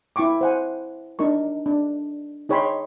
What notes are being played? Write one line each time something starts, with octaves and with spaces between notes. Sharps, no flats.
E4 F4 G5 C#6 D6
C5 F#5 G#5
D4 D#4 A#4 C#6
D4
D#4 G#4 C#5 G5 B5 C6